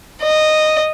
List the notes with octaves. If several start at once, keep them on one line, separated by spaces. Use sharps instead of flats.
D#5